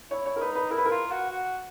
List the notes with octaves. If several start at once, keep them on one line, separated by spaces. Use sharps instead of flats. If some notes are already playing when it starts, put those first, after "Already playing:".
E4 C#5
C#5
A#4
D#4 B4
B4
E4 A#4
B4
A#4
F4
F#4
F#4